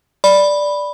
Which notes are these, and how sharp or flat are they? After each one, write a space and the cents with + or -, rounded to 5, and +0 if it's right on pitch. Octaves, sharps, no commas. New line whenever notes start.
D5 +0 B5 +0